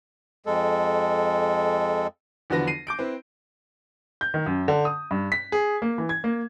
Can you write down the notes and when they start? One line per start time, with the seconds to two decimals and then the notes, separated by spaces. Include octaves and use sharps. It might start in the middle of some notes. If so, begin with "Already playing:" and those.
0.46 F2 G#3 A4
2.50 E2 D3 F3 F#4 B4 A#6
2.67 C7 D#7
2.87 D6 G6 D7
2.99 C4 E4 B4
4.21 G6
4.34 D#3
4.46 F#2
4.68 D3
4.85 D#6
5.11 G2
5.32 B6
5.52 G#4
5.82 A#3
5.98 E3
6.09 G#6
6.24 A#3